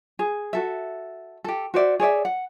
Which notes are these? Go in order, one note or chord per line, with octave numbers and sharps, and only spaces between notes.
G#4
F#4 A4 E5
G4 A4
F#4 C5 D5 E5
G#4 C#5 D5 E5
F#5